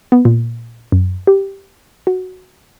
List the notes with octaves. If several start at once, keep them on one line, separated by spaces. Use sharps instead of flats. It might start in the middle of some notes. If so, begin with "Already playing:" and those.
B3
A#2
F#2
G4
F#4